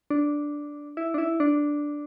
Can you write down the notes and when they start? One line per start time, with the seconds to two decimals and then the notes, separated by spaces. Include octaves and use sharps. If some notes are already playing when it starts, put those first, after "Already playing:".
0.10 D4
0.97 E4
1.14 D4
1.18 E4
1.40 D4